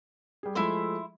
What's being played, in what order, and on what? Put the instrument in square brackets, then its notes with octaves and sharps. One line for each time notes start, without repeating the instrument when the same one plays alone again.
[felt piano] G3 G#4
[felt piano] F3 G#3 A3 [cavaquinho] E4 E5 C6